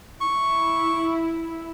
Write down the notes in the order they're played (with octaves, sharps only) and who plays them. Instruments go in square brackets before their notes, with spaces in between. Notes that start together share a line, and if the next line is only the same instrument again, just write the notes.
[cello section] E4 [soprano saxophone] C#6